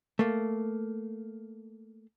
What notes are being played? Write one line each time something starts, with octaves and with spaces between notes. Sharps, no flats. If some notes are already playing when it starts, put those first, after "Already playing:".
A3 A#3